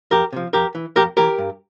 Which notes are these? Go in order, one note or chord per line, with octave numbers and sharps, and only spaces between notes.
F2 G4 A#4
C3 F3
F2 G4 A#4
E3
F2 G4 A#4
E3 G4 A#4
G2